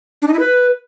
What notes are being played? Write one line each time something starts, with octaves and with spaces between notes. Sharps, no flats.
D4
D#4
E4
B4